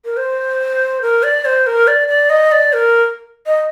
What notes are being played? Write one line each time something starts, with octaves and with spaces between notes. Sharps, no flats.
A#4
C5
A#4
D5
C5
A#4
D5
D5
D#5
D5
A#4
D#5